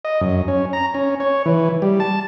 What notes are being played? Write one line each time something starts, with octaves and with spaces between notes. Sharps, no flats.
D#5
F#2
C#4
A#5
C#4
C#5
E3
G3
A5